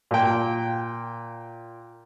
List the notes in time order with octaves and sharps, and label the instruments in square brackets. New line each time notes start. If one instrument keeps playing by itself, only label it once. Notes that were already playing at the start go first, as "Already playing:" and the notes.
[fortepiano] A#2 G5